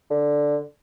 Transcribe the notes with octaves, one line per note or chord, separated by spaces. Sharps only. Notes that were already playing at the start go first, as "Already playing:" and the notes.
D3